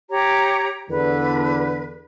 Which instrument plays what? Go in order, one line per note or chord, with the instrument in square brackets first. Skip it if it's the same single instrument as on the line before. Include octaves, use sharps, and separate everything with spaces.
[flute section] G4 C#5 A#5
[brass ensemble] E2 D3 [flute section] B4